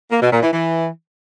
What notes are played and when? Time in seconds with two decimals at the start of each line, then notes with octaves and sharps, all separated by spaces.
0.10 A#3
0.20 B2
0.30 A#2
0.40 E3
0.51 E3